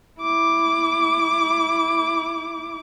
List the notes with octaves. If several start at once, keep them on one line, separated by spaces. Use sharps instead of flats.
E4 D6